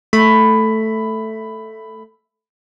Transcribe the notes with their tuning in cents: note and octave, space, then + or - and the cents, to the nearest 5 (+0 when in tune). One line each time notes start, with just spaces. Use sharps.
A3 +0 B5 +10